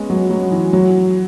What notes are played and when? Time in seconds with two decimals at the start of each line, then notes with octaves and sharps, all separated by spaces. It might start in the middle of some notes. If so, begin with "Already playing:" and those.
Already playing: G#3 B3 C#4
0.10 F#3
0.30 F#3
0.52 E3
0.73 F#3